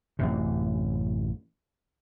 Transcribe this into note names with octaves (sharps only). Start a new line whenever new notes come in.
A1 F#2 C3